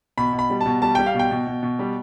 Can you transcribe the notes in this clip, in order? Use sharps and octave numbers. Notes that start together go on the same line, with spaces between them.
B2 B5
B2
B5
G3
A5
B2
G3 A5
G3 G5
F5
B2 G5
B2
B2
B2
G3